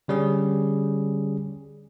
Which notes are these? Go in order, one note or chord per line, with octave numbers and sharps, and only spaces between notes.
D3 G3 C#4 G#4